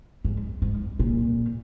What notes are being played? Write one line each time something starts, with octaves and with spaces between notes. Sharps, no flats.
G#2
G#2
A#2